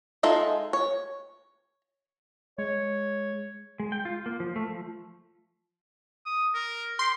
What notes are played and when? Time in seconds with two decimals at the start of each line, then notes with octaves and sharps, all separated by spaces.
0.23 G#3 D#4 F4 A4 E5
0.73 C#5
2.58 G#3 C#5
3.80 G#3
3.92 G5
4.05 F4
4.26 A#3
4.40 F3
4.56 A3
4.68 F3
6.26 D#6
6.54 A#4
6.99 G4 C6